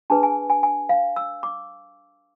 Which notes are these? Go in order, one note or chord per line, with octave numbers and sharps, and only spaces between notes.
D4 G#4 B4 A5
G#5
G#5
G#5
F5
E6
D6